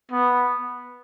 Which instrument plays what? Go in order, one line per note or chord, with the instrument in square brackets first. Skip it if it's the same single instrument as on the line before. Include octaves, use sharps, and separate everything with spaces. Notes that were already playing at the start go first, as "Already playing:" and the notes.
[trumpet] B3